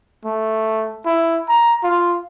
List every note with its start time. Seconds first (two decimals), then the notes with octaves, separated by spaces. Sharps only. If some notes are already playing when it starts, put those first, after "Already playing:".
0.25 A3
1.06 E4
1.49 A#5
1.83 F4